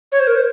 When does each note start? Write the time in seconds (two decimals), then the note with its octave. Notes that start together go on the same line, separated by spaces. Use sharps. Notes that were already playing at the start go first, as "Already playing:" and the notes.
0.12 C#5
0.20 C5
0.27 A#4
0.36 C5